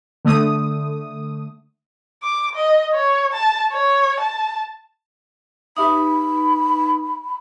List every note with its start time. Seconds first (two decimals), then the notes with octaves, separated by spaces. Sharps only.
0.25 D3 A3 D#6
2.23 D6
2.55 D#5
2.94 C#5
3.33 A5
3.72 C#5
4.20 A5
5.77 D#4 G4 B4 E5 B5 D#6